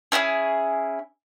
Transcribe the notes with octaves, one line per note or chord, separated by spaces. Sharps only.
C#4 E4 G4 G#4